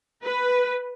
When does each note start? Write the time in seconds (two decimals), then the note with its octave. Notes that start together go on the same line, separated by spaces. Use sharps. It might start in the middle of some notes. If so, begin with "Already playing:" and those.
0.23 B4